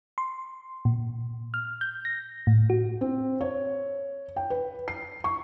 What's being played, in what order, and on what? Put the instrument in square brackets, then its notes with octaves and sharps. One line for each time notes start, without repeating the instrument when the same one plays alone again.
[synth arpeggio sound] C6
A#2
F6
G6
A#6
A2
F#4
[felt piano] C4
C#5
G5
B4
C7
C#6